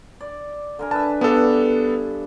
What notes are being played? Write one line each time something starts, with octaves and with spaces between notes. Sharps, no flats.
D5
D3 A#4 G#5
B4 E5 A5
G2 B3 D4 A4